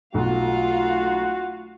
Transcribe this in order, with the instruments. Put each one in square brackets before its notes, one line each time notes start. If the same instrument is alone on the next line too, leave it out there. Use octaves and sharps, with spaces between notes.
[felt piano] B1 [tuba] A3 [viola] F4 F5 [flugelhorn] F#4